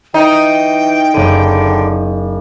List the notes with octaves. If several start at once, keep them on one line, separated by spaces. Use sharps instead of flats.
E3 D#4 G5
F#1 D3 D#7